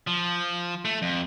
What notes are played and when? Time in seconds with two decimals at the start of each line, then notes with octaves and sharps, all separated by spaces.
0.07 F3
0.85 A3
1.02 F2